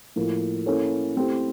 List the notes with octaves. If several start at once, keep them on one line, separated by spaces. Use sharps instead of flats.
A2 F3 A#3
A#3 C#4 E4 A4 C#5
A3 C4 E4 G4